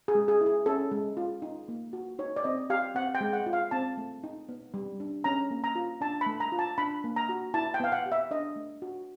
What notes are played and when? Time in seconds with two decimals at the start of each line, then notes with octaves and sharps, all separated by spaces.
0.08 G#4
0.15 G#3
0.28 G#4
0.41 E4
0.46 G#4
0.66 C#4 A4
0.91 G#3
1.17 F4
1.42 D#4
1.68 A#3
1.93 F#4
2.19 D#4 C#5
2.36 D5
2.44 C4 D#5
2.70 G4 F5
2.95 C4 F#5
3.15 G5
3.21 G#3
3.33 F#5
3.46 F4
3.53 F5
3.71 C4 A5
3.97 A3
4.24 D#4
4.49 B3
4.74 G3
5.00 D4
5.24 C#4 A#5
5.51 A#3
5.64 A#5
5.75 F4
6.01 D4 A5
6.21 B5
6.26 A3
6.40 A#5
6.52 F4
6.59 A5
6.78 D4 B5
7.04 A#3
7.16 A#5
7.29 F#4
7.54 E4 A5
7.74 G5
7.80 B3 F5
7.92 F#5
8.06 G4
8.12 E5
8.31 D4 D#5
8.56 A3
8.82 F#4